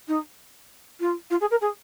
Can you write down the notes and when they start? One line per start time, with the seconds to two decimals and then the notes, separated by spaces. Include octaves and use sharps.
0.08 D#4
1.00 F4
1.30 F4
1.41 G#4
1.51 A#4
1.61 G#4